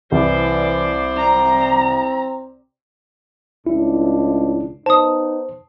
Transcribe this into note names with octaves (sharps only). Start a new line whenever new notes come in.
C2 E3 C5 D5
C4 A#5
C#2 A2 D4 E4
B3 D#4 C5 A5 D#6